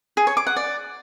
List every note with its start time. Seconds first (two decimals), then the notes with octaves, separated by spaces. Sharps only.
0.17 G#4
0.27 C#5
0.37 D6
0.47 F#5
0.56 D5